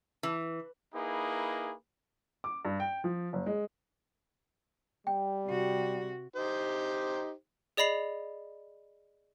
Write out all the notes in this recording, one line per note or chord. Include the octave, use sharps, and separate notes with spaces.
E3
A#3 D#4 E4 G#4 B4
D6
G2
G5
F3
F#1
G#3
G3 G5
C3 F#4
D#4 G4 C5
G#4 D5 D#5 B5 C7 F7